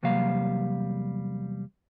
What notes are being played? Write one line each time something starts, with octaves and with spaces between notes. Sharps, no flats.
E2 C3 F#3 G3 A#3 F5